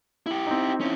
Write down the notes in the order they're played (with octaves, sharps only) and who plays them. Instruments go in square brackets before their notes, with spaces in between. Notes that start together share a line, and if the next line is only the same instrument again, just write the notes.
[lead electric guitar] E4 G4
[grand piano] C4 D#4
[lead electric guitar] C#4 E4